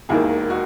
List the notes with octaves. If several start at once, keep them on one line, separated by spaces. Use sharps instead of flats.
E1 D#2 D#3 A#3 E4 G#4
D#4 F#4